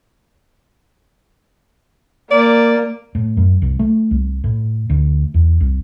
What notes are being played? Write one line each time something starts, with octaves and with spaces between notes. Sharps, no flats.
A#3 D5
A2
F#2
C2
A3
C2
A2
D2
E2
C2